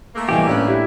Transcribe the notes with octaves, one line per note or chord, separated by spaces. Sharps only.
A3 A#3
C3 E3 G3 G4 D#5 E5 G#5
A2 C#4 D4 B4
E4 G4